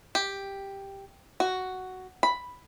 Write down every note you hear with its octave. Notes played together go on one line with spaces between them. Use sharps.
G4
F#4
B5